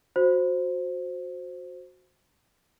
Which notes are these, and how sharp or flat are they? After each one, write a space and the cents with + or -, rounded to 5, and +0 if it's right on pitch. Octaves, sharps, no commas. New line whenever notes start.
F#4 -20 C5 +0